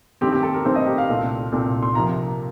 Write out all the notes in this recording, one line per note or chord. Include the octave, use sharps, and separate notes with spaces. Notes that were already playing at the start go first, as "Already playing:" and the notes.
G2 D#3 A3 C4 G4
G4
A4
A#4
G2 D#3 A3 C4 C5
D#5
G4
F5
C2 A#2 A3 C4
C2 A#2 A3 C4
C6
C3 F3 A#3 A#5